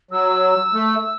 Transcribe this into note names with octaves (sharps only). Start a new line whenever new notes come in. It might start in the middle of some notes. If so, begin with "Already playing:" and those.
F#3 E6
A3